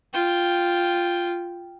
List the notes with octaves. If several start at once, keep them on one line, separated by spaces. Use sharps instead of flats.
F4 G5